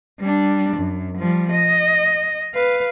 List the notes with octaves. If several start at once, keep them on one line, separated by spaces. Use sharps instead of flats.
G3 D4
F#2
F3 G3
D#5
B4 F5